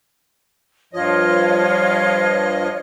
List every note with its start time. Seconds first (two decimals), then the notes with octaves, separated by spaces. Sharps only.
0.93 G2 F3 F4 C#5 D#5